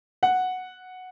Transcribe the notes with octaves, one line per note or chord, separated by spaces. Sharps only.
F#5